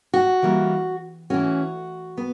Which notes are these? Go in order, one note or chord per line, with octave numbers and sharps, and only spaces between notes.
F#4
E3 G3 A#3
E3 A3 C#4 F#4
B3